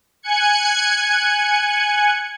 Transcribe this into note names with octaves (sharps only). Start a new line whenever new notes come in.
G#5 F#6 G#6 C#7